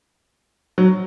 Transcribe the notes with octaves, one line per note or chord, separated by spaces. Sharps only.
F#3